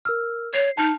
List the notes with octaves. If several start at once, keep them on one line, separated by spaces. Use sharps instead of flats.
A#4 E6 F6
C#5 C7
D#4 A5 F6